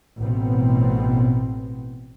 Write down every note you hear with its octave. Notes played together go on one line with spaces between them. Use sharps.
A1 B2 B3 C4